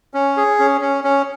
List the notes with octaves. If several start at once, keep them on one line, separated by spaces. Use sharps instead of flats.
C#4
G#4
C#4
C#4
C#4